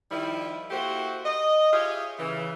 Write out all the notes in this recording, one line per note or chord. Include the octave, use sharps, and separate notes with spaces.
D#3 F3 G3 E4
A#3 E4 F#4 G4 A4 C5
D#5
F4 G4 G#4 C#5 E5 F5
C#3 E3